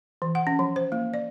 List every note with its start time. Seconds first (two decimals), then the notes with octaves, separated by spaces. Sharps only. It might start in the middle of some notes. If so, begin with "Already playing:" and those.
0.22 E3
0.35 F#5
0.47 C#4
0.59 F3
0.76 C5
0.92 A#3
1.14 D5